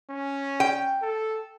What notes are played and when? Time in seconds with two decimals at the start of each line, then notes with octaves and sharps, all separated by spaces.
0.10 C#4
0.60 G5
1.02 A4